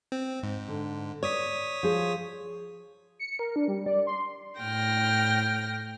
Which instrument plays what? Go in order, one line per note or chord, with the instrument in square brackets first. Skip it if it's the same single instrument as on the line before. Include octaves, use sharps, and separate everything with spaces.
[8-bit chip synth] C4
G#2
[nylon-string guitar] D3
[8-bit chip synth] C#5 D#6 B6 [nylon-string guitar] D5
[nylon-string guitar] F3 G#4
[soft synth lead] C#7
A#4
D4
G3
D5
C6
[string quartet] A2 G5 F6 A#6